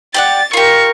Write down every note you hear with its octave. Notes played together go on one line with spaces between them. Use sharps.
G4 D5 F#5 A6
F4 G4 A#4 C#6